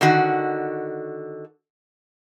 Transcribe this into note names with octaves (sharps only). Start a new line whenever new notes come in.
D3 D#3 F#4